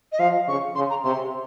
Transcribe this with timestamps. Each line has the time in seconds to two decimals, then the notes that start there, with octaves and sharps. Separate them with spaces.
0.12 D#5
0.19 F3 F5
0.48 C#3 C#6
0.75 C#3 C6
0.90 A#5
1.04 C3 C6